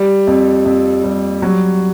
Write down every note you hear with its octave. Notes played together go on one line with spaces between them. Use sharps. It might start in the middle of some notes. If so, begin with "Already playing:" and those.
Already playing: G3
F2
F2
G3
F#3